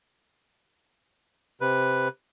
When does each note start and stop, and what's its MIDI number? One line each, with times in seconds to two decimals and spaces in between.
1.61 2.08 48
1.61 2.08 71